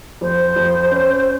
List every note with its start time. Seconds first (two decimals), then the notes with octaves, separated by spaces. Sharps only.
0.21 F2 C5
0.56 F2
0.91 C#4